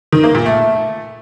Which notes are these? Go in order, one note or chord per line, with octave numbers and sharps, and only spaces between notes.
D#3
A#3
A#2
A3